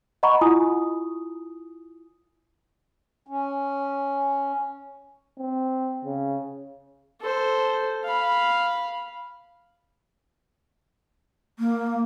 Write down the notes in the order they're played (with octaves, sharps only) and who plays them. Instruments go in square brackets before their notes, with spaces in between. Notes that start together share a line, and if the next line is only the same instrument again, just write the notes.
[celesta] D#5 F#5 A#5 B5 C#6
E4 F4 G#5 D#6
[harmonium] C#4
[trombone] C4
C#3
[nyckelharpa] A4 C5
F5 B5
[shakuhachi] A#3